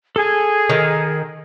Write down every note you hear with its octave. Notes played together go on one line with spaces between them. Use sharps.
G#4 A4 G#5
D#3